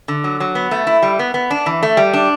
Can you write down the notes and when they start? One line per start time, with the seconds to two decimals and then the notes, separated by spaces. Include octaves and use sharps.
0.08 D3
0.24 F#3
0.40 F#3
0.55 B3
0.71 A3
0.87 E4
1.02 G3
1.19 B3
1.34 B3
1.51 D4
1.66 E3
1.83 A3
1.97 G3
2.14 D4